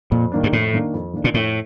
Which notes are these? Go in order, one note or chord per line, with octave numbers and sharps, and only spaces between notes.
F2 A#2
D#3 A#3 D4
G2
F2 A2
D#3 A#3 D4
F2
D#3 A#3 D4
A#2
F2 A2